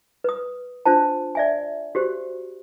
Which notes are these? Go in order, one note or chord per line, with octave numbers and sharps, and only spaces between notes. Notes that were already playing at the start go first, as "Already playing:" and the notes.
B4 D#6
D4 F4 C5 A5
D5 E5 G#5
F#4 G4 C5